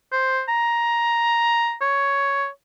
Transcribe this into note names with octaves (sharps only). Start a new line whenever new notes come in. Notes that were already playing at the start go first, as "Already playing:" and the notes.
C5
A#5
C#5